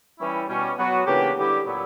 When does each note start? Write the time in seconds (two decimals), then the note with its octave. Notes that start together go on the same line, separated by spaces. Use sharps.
0.20 E3 G3 C#4 E4
0.49 B2 G3 C#4
0.78 F#3 B3 F#4
1.07 C#3 E3 A#3 D4 G4
1.36 D3 G3 B3 E4 G4
1.65 A#2 F#3 B3 E4